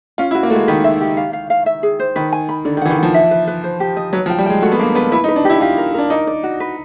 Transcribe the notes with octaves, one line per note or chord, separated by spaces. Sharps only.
C#4 F4
E4
F#4
A#3
G#3 A3 F#4
D#3 B4
E5
G4
F5
F5
F5
E5
G#4
C5
D#3 B4
G#5
B5
D3 D5
D#3
E3 F#5
D#3
F3 F#5
E5
B4
B4
C5
G4
D#5
F#3 B4
F3
G5
G3
G#3 G5
A3 F#4
B3
A#3 D4
B3 B4
E4 B4
D#4
B4
D4
E4 G4
F4 G4
A#4
D4 A#4
D#4 D5
D5
F#4
B4